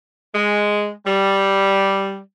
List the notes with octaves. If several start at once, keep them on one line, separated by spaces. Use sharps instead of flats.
G#3
G3